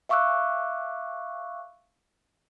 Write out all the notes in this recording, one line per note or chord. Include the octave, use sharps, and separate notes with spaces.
E5 F5 C#6 D6 E6 F#6